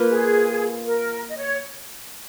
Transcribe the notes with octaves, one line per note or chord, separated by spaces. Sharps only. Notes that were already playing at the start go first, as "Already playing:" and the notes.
Already playing: A#3 F4 B4
G#4
A#4
D#5
C#5